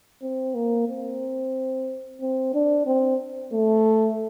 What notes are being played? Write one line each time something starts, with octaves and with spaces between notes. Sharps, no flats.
C4
A#3
C4
C4
D4
C4
A3